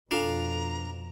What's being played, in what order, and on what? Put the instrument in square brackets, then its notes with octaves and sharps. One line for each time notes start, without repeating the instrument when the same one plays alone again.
[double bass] F2 B2 [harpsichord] D4 F5 [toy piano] F4 A4 G#5 [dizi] A#5